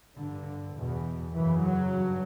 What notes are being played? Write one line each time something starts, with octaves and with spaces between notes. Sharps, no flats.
G2 D3
E2 B2
F#2 C#3 E3
F#3
G2